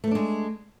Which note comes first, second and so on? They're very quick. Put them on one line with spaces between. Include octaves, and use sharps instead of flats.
A3 B3 D4 G#3